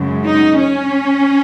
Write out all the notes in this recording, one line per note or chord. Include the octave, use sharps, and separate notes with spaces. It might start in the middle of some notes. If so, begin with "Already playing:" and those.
Already playing: F#2 C#3 G#3
D#4
C#4